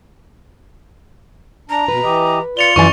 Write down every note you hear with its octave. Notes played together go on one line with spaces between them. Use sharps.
D4 A#5
B2 B4
E3 G4 D#5
F4 D5 C#7 F7 G7
F#2 E3 D5 G#5 C#6